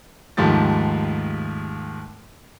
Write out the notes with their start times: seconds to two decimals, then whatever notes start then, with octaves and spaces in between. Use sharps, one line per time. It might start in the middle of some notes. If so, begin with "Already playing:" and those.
0.37 D#2 G#2 F3 A3 G4 A6